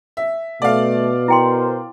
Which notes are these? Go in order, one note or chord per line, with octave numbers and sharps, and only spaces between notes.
E5
B2 A3 D5 F5
E4 A#4 C5 G5 C6